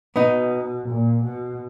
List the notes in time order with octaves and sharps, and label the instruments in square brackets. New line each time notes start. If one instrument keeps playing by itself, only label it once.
[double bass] B2 [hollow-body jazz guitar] B3 D#4
[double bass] A#2
B2